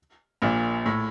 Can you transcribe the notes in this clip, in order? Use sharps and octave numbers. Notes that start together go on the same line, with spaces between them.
A#1 A#2
A2